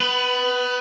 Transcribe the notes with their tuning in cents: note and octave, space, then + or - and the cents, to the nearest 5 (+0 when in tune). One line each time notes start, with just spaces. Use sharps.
B3 +25 B4 +0